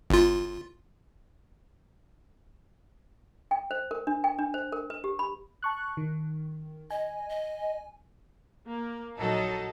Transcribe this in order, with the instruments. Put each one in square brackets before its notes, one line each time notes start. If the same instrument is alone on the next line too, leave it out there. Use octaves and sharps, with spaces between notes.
[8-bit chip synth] G1 F4
[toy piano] G5
C5
A#4
D4
G5
D4
C5
A#4
B4
G4
B5
[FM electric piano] A5 C#6 F#6
D#3
[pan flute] D#5 [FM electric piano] G#5
[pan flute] D#5
[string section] A#3
A#1 F#3 D#4 A4